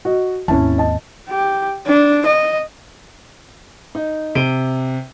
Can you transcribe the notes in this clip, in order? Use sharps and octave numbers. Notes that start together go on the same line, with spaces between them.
F#4 D#5
G#1 D#2 C#4 E4 A5
D#5 A5
G4
D4
D#5
D#4
C3 D7 D#7 G7